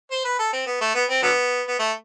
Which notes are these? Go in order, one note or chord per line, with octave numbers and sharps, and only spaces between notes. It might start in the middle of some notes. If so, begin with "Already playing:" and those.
C5
B4
A4
C4
B3
A3
B3
C4
D3 F#3 B3
B3
A3